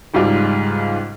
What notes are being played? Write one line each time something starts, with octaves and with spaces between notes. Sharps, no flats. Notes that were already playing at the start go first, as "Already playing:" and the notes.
C#2 G#2 G3 F4 D6